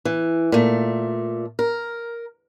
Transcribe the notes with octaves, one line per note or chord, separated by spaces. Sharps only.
E3
A#2 A3
A#4